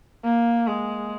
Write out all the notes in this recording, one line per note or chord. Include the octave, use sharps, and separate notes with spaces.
A#3
G#3